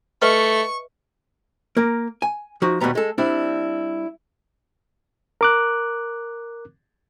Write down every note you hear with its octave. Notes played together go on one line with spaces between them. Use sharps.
A3 B4 D#5 E5 C#6
A#3 A#4
G#5
F3 D#4 F#4
D#2 B2 E3 G3 B3 A#5
G#3 A4
G3 C4 D4 E4
A#4 D6 F#6